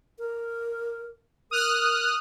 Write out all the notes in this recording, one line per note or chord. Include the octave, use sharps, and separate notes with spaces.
A#4
A#4 D#6 F6 F#6